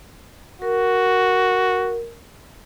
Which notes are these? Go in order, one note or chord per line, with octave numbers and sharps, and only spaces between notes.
F#4 A#4